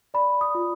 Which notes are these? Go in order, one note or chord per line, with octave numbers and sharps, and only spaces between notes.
D5 B5
D#6
F4